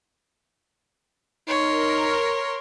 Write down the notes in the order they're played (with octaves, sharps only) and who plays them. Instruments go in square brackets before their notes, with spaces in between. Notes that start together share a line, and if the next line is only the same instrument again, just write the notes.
[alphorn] D#4 [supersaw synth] A#4 [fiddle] C#5 C6